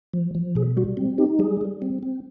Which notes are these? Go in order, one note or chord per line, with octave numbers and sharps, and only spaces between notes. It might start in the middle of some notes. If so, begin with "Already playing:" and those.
F3
F3
B2 G#4
G3 F#4
C4
D#4 G4
G3 G#4
G3
C4
C4